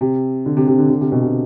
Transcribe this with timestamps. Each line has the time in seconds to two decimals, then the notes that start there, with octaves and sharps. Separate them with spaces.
0.01 C3
0.46 D3
0.57 C3
0.67 C3
0.79 D3
0.90 D3
1.01 C3
1.12 B2
1.22 C3